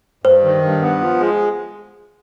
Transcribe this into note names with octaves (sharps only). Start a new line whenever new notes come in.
G2 C5
D#3
G2
B3
F3
G#3